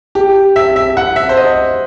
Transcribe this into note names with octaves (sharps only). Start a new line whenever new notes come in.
G4
E5
E5
F#5
E5
C5
D#5